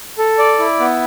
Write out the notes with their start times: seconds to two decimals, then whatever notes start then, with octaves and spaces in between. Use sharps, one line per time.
0.18 A4
0.39 D5
0.59 E4
0.80 B3